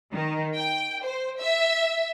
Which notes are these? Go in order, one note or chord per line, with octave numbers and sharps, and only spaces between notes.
D#3
G5
C5
E5